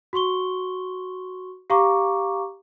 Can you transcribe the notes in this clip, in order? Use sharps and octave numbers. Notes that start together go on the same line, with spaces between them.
F#4 C6 C#6 G7
G4 F5 A#5 C#6 D6